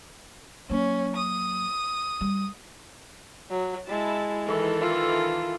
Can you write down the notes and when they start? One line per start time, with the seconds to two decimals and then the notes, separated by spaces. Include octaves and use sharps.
0.69 F#3 A#3 C#4
1.17 D#6
2.21 G3
3.50 F#3
3.88 G#3 E4 A5
4.47 D#3 E3 A4
4.81 F4